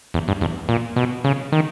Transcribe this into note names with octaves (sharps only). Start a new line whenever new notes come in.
E2
G2
E2
A#2
B2
C#3
D#3